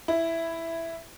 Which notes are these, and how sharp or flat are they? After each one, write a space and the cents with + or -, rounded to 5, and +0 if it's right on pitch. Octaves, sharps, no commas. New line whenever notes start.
E4 +5